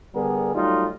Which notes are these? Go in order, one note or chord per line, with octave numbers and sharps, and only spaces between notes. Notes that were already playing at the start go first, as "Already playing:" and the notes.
D3 G3 B3 G#4 A#4
F#3 G3 A3 D#4 F4